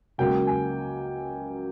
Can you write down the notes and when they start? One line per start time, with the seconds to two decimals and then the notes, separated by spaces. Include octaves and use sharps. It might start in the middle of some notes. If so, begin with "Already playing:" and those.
0.18 C#2 C#3 F#3 A#3 G5
0.47 G#5